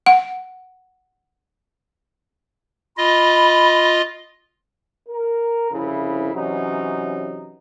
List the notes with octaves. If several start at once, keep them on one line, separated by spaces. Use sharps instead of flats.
F#5
F4 D#5 B5
A#4
C2 F2 C#3 E4
C3 E3 F#3 C#4 D#4